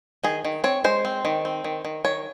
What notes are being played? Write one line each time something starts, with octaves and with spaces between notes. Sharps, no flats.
D#3 G#4
D#3
C4 C#5
G#3 C5
C4
D#3
C4
D#3
D#3
D#3 C#5